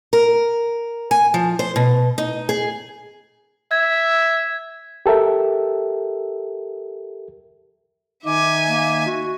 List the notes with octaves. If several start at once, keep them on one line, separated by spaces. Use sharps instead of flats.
A#4
G#5
F3
C5
B2
D#4
G#4
E5 G#6
G4 A4 A#4 E5
D#3 D#4 E5 G#5 D6
A#3
F#4